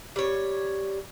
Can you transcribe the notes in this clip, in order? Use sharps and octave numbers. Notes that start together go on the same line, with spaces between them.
G3 C#5